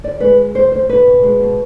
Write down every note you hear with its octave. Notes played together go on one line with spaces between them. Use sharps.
D2 D5
G#3 B4
D2
D2 C5
D2 C5
D2 B4
B2
G#3
B2